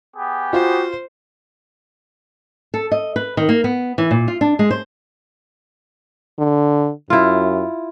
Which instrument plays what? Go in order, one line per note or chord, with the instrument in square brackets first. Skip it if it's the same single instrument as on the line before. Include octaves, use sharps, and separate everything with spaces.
[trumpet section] B3 G4 G#4
[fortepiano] F4 [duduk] F#4 [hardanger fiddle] C5
[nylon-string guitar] A4
D#5
B4
D#3
A#3
B3
E3
A#2
F4
D4
G#3
C5
[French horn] D3
[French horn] F#2 [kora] E4 F4